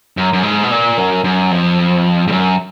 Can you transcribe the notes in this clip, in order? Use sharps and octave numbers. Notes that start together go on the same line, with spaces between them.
F#2
F#2
G#2
B2
A#2
F#2
F#2
F2
G#2
F#2